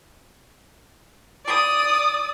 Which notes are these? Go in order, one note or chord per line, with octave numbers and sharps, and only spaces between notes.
D5 D#6